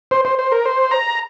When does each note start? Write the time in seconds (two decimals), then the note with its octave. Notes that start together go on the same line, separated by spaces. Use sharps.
0.11 C5
0.25 C5
0.39 C5
0.52 A#4
0.65 C5
0.91 A#5